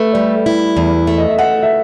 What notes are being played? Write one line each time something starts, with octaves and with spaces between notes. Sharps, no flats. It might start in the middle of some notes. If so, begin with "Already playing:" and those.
Already playing: A3 B4
G3
E4
E2
A3
D#5
E5
A3 F#5
E5